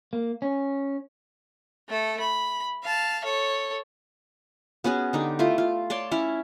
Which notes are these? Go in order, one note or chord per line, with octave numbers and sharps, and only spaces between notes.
A#3
C#4
A3 A4
B5
F5 A5
A4 C#5
B3 C#4 F#4 G#4
D3 D#4 G4
A3 E4 F4
F4
C#5 D5 A5 C6
C#4 E4 C#5